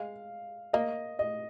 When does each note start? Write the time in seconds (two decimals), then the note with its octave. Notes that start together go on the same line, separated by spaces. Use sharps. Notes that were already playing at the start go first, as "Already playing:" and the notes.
Already playing: G#3 F5
0.73 A#3 D#5
1.19 D#5